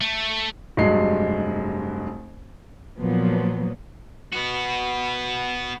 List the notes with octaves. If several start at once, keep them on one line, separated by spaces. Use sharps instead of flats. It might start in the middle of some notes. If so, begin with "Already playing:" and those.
A3
F1 G2 F#3 G#3 C7
A#2 F3 F#3 B3
B3 F#4